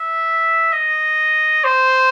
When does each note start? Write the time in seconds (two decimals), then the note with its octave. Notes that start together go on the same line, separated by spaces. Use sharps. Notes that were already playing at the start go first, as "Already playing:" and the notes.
Already playing: E5
0.73 D#5
1.64 C5